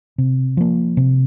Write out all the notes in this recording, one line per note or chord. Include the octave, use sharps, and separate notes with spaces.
C3
F3 A#3
C3